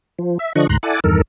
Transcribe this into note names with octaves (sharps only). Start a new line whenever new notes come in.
F3
E5
D3 F3 D4 D#5 C#6 F#6
D2 G#2 A#5 C6 F#6
E4 A4 D5 F#5 G#5 D6
E2 G2 D#3 A4 A#4